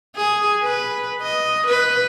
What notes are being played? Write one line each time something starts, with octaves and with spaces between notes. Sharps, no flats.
G#4
B4
D#5
B4